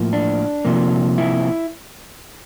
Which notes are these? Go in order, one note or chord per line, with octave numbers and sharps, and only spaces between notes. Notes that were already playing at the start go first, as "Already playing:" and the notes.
Already playing: A2 F3 A#3
D4
C3 F3 A#3
E4